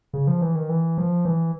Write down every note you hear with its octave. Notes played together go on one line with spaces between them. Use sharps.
C#3
F3
E3
D#3
E3
F3
E3